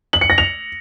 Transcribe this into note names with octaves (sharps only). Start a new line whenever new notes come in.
F#7
C#7
A#6
F7